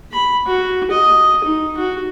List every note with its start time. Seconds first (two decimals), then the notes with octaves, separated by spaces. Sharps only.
0.12 B5
0.47 F#4
0.91 D#5
1.44 D#4
1.77 F#4